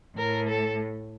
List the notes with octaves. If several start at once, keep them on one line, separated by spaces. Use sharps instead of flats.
A2 A#4
A4